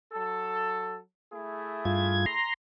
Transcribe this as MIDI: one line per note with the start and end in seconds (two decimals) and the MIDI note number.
0.13 0.99 54
0.13 0.99 69
1.32 2.36 57
1.32 2.36 64
1.32 2.36 68
1.85 2.26 43
1.85 2.26 65
1.85 2.26 92
2.26 2.54 82
2.26 2.54 84